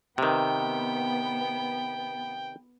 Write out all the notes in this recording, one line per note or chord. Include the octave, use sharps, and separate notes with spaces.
C3 D#3 B3 G5